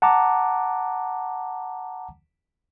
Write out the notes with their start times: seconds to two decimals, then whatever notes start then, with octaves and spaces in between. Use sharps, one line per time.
0.02 F#5 A5 A#5 D6